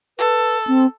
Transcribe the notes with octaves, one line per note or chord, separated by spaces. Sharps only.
A4 B4
C4